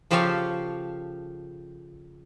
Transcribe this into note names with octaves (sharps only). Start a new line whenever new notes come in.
C#3 F3 G4 A4 C#5 F5